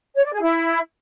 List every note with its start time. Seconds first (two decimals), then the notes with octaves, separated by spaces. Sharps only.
0.16 C#5
0.24 D5
0.33 G#4
0.41 E4